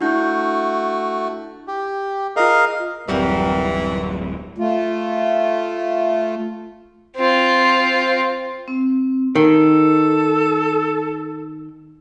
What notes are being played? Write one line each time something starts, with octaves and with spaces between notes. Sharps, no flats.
A3 D4 E4 F#4 G6
G4
F4 G#4 A#4 D#5 F5
D1 F#2 E3 G3 C4 F#4 G4 A#4
A3 F4
C4 F4
C4
D#3 A4